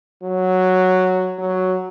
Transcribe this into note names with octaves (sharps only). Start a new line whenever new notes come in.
F#3
F#3